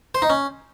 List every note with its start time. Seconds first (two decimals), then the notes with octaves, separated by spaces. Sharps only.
0.15 C5
0.22 D#4
0.30 C#4